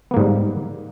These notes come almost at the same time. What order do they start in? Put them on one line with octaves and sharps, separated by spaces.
B3 A#3 G#2 G3